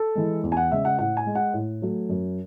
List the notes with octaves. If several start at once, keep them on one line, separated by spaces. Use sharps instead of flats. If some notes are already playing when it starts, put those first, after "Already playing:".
Already playing: A4
E3 G#3
E2
G#5
F#5
C#3 G#3 E5
F#5
A2 F#5
G#5
G#3
F#5
A2
F#3 A3
F#2